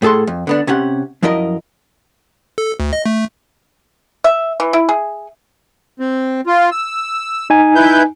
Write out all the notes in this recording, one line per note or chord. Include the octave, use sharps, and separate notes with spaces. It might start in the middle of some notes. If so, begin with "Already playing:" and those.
A2 G#4 A4 F#5 C6
F2
D3 B3 D4
C3 C#4 G4 F#5
F#2 F3 E4 A#4 D#5
A4
D2
D#5
A3
E5
E3
E4
G#4
C4
F4
E6
D#4 G#5
E4 B4 G6